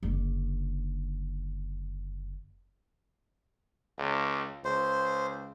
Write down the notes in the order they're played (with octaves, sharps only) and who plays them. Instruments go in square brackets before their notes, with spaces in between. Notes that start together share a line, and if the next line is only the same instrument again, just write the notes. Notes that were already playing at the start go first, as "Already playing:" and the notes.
[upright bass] F#1 D3
[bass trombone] C#2
[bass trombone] C#2 [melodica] C5